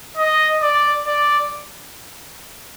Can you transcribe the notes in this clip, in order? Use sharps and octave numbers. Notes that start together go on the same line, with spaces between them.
D#5
D5
D5